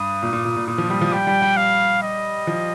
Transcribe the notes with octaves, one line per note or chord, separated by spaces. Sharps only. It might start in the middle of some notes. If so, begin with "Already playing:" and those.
Already playing: G2 D#6
A#2
A#2
A#2
A#2
A#2 D#6
F3
G3
F3
G3 G5
G3
G3
F5
D#5
F3